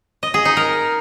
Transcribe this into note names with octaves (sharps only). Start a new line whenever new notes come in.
D#5
G#4
D#4
A#4